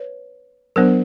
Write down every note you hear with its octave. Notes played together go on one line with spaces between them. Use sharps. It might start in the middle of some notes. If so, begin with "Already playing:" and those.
Already playing: B4 C#5
F#3 B3 D4 A#4 C5